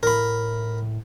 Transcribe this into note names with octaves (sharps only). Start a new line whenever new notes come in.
A2 A#4 B5